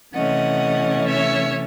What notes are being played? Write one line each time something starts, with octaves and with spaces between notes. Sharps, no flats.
C3 E3 A3 C#4 D#5 F#5
C#5 E5